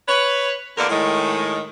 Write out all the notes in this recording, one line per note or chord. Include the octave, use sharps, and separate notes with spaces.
B4 C#5
E2 D3 A#3 A4 A#4 D5
A2 D#3 G#3